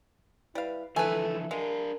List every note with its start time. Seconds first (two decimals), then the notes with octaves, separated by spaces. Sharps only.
0.55 G3 E4 B4 F5
0.96 D3 E3 F3 A3 A4 B4 G#5
1.51 G#3 D4 A#4 F5